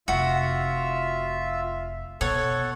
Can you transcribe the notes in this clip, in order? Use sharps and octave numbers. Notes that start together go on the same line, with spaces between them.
F1 F4 F#4 E5
B2 A4 C#5 F#5